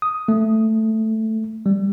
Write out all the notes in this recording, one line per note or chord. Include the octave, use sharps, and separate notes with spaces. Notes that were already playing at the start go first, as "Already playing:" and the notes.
D#6
A3
G3